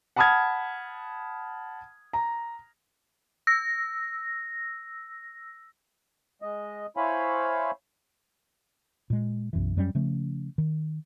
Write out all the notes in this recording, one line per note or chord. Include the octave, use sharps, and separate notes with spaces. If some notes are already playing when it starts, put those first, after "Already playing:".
F#5 A5 B5 D#6 F6 G#6
A#5
E6 A#6
G#3 D#5
E4 C5 C#5 F5 G#5 B5
A#2 G#3
B1 F#2 E3
F#2 F#3 G3 C#4
C#3 F3 A3 C#4
D#3